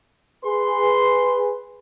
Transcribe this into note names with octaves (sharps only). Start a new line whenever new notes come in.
G#4 B4 C6